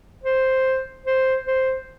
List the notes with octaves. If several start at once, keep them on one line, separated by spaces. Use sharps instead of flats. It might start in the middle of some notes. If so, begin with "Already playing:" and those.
C5
C5
C5